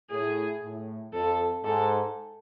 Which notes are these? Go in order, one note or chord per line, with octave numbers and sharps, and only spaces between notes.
A2 G#4
A2
F2 A4
G#2 A4